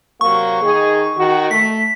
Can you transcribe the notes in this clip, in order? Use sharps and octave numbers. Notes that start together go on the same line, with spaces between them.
C3 F#3 A#3 C#6
D#3 D#4 G#4
D#3 F#4
A3 B6